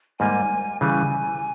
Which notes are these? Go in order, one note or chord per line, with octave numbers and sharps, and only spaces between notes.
G#2 G3 A#3 G#5
C#3 E3 G3 G#5